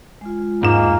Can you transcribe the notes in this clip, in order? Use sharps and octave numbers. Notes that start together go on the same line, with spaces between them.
G#3 F4
E2 G#2 A#3 F4 F#5 G#5